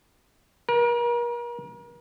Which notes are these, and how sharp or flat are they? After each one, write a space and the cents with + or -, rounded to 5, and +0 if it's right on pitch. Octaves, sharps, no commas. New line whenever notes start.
A#4 +40